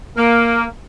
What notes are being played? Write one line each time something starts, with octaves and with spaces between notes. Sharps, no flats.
A#3